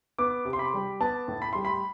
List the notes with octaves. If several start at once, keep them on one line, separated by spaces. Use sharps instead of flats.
B3 D6
C3
C6
B5
G3
B3 A5
A2
B5
G3 C6
B5